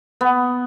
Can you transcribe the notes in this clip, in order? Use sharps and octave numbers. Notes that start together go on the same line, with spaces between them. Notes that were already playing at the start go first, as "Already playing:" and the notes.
B3